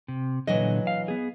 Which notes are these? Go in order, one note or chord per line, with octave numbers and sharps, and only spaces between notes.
C3
A#2 D3 E3 F#3 D#5
F5
B3 G#4